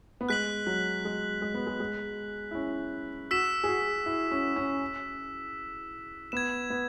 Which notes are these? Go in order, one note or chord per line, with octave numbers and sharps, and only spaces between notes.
B3
G#3 F#6 B6 F#7
F#3
G#3
G#3
B3
G#3
G#3
E4
C#4
F#4 E6 B6 E7
G#4
F#4
E4
C#4
C#4
B3 G#6 E7
B3